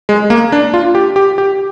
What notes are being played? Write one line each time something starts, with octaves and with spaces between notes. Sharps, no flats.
G#3
A#3
D4
F4
G4
G4
G4